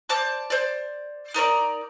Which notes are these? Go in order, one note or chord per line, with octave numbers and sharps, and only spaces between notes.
C5 D5 A5 D6
C5 D5
D#4 A#4 C#5 D5